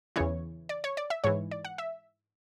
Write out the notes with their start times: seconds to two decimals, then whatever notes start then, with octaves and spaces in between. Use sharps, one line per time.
0.16 E2 C#3 E3 C#5
0.69 D5
0.84 C#5
0.97 D5
1.10 E5
1.24 G#2 E3 C#5
1.51 D5
1.65 F#5
1.78 E5